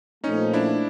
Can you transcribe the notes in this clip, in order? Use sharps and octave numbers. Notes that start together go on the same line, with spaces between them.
A#2 F3 A3 C#4 D#4
D4 E4